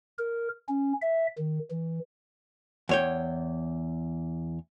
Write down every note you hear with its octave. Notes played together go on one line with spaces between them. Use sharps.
A#4
C#4
E5
D#3
E3
E2 C#5 G5